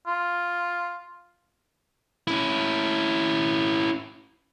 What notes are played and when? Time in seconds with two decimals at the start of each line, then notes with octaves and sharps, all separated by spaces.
0.06 F4
2.28 C#4 E4